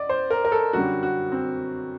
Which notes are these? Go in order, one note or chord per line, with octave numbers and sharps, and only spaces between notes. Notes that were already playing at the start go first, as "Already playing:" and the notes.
Already playing: D5 D#5
C5
A#4
A#4
A4
F#2 D3 G3 F#4
F#4
C4